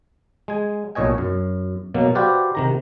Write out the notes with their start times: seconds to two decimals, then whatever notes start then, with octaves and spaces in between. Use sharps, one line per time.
0.48 G#3 G#5
0.95 B1 A#2 C#5 D#5 G#5
1.18 F#2
1.94 B2 F#3 A#3
2.15 F#4 G4 B4 C5 D5 F5
2.55 C3 D#3 A#5